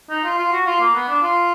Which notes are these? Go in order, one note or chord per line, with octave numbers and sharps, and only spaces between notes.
D#4
F4
F4
F#4
F4
A#3
B3
D4
F4